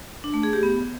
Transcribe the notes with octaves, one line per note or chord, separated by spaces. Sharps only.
D4
A3
G#4
G4
B3